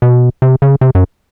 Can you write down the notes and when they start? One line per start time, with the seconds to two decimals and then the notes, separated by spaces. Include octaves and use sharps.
0.02 B2
0.42 C3
0.62 C#3
0.81 C3
0.95 F#2